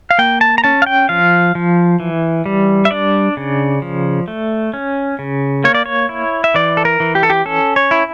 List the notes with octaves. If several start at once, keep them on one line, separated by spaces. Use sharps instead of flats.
F5
A#3 G5
A5
A#5
C#4 A5
F5
G5
F3 F5
F3
E3
G3
E5
D4 D5
C#3
F3
A3
C#4
C#3
A#3 C#5
D5
C#5
E4
E5
E3 D5
A4
A#4
E3
G4
A4
G4
C#4 A4
C#5
E4